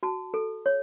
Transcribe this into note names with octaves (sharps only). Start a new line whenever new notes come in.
F#4 A5
A4
C#5